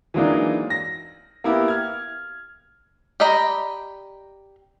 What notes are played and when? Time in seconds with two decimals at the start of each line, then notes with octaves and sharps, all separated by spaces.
0.14 E3 F#3 G#3 A#3 D4 D#4
0.70 A#6
1.44 A#3 B3 E4 G4
1.68 F6 G#6
3.20 G4 D5 D#5 A#5 B5